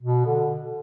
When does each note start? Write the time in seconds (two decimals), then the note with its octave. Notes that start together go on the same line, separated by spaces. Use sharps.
0.02 B2
0.25 D3